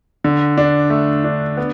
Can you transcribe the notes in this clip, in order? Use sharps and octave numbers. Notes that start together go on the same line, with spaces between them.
D3
D4
A3
D4
B3